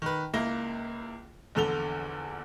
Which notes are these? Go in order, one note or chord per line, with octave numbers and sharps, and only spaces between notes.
D#3 B4
C#2 A#3 E4 A#6 G7
A#1 E2 D3 A4 F7 G7